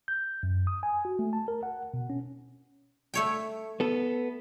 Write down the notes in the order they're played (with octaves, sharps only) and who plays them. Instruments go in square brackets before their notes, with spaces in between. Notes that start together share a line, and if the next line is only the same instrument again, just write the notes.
[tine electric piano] G6
F#2
D#6
G#5
F#4
A3
A5
A#4
F#5
B2
C#4
[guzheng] A3 C#5 G5
[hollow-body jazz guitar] B3 A4